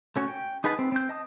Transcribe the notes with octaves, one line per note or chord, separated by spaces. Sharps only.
A3 C#4 F#4
G5
D#4 G#4 B4 F#5 A5
C4
C4 G6
D#5 A5 D#6